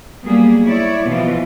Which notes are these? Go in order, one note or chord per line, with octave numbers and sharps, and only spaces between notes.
F#3 G3 A#3 B3 G#4
E4 C#5 D5
B2 E3 F3 B3 F4